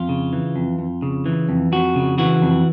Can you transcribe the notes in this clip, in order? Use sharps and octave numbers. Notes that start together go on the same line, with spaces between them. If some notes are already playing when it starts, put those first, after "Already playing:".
Already playing: F2 F4
C#3
E3
F2
F2
C#3
E3
F2
F2 F#4
C#3
E3 F#4
F2